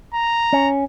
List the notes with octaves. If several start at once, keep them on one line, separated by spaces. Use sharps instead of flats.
A#5
C#4